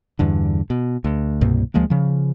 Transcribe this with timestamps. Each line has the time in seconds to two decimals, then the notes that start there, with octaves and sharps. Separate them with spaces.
0.19 E2 G2 D3
0.70 B2
1.04 D2
1.41 C2 G2 B2 A#3
1.74 D2 F3 G#3 A#3
1.90 C#3 F3